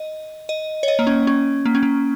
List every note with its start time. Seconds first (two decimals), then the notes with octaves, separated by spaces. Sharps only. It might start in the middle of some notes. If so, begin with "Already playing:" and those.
Already playing: D#5
0.49 D#5
0.83 C#5
0.88 D#5
0.99 A#3
1.07 C#4
1.27 C#4
1.65 A#3
1.75 C#4
1.83 A#3